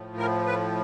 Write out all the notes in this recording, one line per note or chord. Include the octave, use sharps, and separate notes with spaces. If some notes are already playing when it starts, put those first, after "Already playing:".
Already playing: A2 F3
A#4
B4